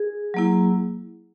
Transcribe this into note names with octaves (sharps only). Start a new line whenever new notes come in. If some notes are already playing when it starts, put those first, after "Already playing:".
Already playing: G#4
F#3 A#3 E4